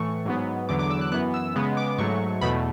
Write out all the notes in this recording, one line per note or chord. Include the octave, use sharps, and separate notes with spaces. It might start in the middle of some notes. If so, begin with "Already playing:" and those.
Already playing: A2 E3 A3 C#6
G#2 F#3 B3
E2 D3 F#3 B3 D6
D6
E6
F#6
F#2 E3 B3 F#6
E6
C#3 G#3 B3
D6
G#2 F#3 A3 C#6
E2 B2 A3 B5